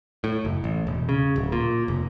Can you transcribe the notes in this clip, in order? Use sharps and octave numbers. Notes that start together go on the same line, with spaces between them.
A2
F#1
A1
E1
C#3
D1
A#2
F1